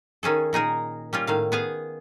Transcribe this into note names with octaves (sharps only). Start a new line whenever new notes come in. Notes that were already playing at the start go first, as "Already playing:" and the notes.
D#3 C#4 G#4 A4
A#2 D#4 G#4 A#4
G3 C#4 F4
A2 D#3 F5
B3 G#4 F5